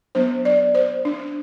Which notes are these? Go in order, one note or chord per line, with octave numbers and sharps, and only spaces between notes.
F#3 B3 D4 C5
D5
C5
D4